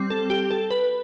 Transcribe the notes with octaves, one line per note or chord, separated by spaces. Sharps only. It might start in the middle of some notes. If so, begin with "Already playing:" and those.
Already playing: G3 C4
A4
G4
A4
B4